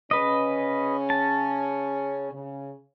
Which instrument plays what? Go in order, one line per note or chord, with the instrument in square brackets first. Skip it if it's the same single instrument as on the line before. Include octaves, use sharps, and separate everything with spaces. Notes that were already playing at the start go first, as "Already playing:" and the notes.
[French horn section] C#3 C#4 [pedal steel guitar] B4 D#5
[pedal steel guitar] A5
[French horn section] C#3